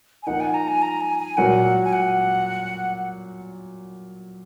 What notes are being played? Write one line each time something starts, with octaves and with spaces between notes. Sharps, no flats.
G#5
F3 A#3 D#4 F#5
G#5
A#5
G#5
A#5
G#5
G#5
A#2 F#3 A#3 F#5
G#5
F#5